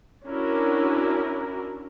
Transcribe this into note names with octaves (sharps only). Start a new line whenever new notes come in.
C#4 D4 E4 F#4 A#4